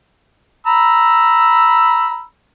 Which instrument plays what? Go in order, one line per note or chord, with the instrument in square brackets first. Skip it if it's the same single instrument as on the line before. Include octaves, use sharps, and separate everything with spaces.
[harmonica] A#5 B5 E6